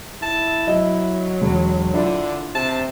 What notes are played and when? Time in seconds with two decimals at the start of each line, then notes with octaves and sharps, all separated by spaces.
0.22 E4 A5
0.67 F#3 D#5 E5
1.42 E1
1.94 D3 D4 E4 F4
2.55 C3 A5